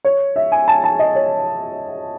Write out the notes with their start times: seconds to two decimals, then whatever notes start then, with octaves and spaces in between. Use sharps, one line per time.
0.05 C#5
0.36 E5
0.52 G#5
0.68 A5
0.84 A5
0.99 D#5
1.15 C#5